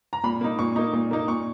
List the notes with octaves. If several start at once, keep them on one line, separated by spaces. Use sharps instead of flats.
A#5
A#2 B5
A#3 D#4
A#2 C#6
A#3 D#4
A#2
A#3 D#4
A#2 C#6